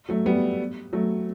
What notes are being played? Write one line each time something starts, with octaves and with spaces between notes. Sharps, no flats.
F#3 A3
G3 B3
F#3 A3